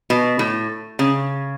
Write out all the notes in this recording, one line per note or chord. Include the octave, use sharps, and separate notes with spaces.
B2
A2
C#3